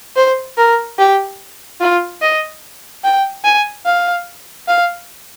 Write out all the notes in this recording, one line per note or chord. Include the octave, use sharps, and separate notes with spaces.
C5
A#4
G4
F4
D#5
G5
G#5
F5
F5